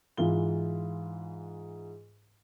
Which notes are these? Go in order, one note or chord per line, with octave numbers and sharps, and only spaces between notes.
G#2 E3 F4 G7